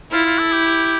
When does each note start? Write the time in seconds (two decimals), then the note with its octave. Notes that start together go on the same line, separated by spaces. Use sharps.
0.12 E4 F4
0.26 F4
0.39 A4
0.52 G4
0.65 G4